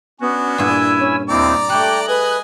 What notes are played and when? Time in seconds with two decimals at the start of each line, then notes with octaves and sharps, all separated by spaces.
0.20 B3 C#4 D4 F#4
0.58 G2 A#2 E4 G#5 E6
0.98 C#4
1.29 D#2 C4 E4 D5 A#5 D6
1.69 G3 A3 G5 F#6
2.08 G#4 B4 D#5 G#5